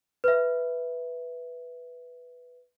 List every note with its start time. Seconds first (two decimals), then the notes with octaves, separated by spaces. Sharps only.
0.24 B4 E5